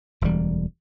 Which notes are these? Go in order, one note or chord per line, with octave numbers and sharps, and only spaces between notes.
E1 D2 E3 G3